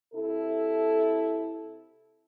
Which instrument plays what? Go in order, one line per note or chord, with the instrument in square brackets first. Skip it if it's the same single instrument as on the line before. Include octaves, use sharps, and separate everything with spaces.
[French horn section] C3 E4 A4